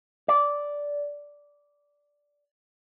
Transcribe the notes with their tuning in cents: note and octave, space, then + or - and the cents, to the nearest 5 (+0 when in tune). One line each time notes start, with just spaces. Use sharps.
D5 -10